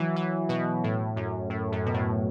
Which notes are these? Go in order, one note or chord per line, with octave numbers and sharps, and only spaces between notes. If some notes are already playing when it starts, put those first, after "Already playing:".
Already playing: E3 F#3
E3
B2
A2
F#2
A2
F#2
B2
A2